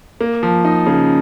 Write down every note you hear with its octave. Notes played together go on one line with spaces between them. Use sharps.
A#3
F3
D#4
C#3